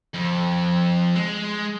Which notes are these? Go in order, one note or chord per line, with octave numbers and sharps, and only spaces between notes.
F2
G#3